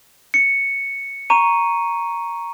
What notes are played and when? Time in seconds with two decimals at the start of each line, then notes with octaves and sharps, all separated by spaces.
0.34 C#7
1.30 A#5 C#6 D#7